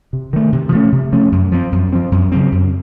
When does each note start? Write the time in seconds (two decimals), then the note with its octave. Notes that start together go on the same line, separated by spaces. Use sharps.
0.13 C3
0.33 D#3 A3
0.53 C3
0.72 F3 A3 C#4
0.92 C3
1.12 F3 A3 C#4
1.32 F#2
1.52 F3 C4
1.72 F#2
1.93 F3 C4
2.12 F#2
2.32 C#3 F#3 C4
2.52 F#2